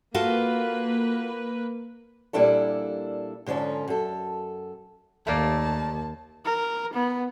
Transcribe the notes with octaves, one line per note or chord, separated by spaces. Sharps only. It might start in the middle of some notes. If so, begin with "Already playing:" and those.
A#3 F4 F#4 A4 B4
A#2 G3 A#3 D4 E4 A4
G#2 D3 F3 C#4
F#2 A4
D#2 A3 A#3 D5 A5
A#4
B3